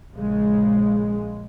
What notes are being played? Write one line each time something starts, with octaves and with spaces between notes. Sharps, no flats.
A#1 C#3 G#3